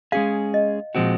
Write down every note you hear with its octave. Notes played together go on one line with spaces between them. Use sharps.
G#3 C#4 G#4 F5
D#5
A#2 F3 G#3 C4 F#4